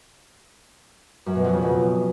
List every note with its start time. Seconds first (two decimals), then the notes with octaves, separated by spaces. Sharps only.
1.26 F#2
1.35 B2
1.44 F2
1.53 C#3
1.62 B2